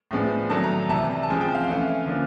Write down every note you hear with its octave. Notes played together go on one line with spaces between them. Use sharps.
A2 F3 G#3 B3 D4
D#3 F#3 A3 D4 A5
A#5
C3 E3 G3 A5
A5
C#3 F3 G#3 C4 G#5
G5
F5
E3 A3 C#4
D3 F3 A#3 C#4